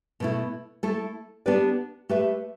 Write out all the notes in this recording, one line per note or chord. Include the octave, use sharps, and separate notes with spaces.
B2 A3 E4
A3 E4 A4
B3 D4 G4 B4 D5
A3 G4 B4 E5